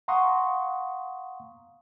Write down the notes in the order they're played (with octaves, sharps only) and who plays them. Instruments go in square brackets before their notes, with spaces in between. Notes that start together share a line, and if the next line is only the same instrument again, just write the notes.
[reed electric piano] F5 F#5 A#5 C6 C#6 D#6